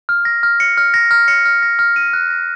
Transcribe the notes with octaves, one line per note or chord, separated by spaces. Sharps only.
F6
A#6
F6
C#7
F6
A#6
F6
C#7
F6
A#6
F6
D#7
F#6
A#6